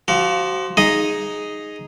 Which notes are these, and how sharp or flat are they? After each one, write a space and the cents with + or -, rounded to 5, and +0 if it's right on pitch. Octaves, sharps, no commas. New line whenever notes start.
F3 +0 F#4 +30
D#4 +0 G#4 +0 D#5 +0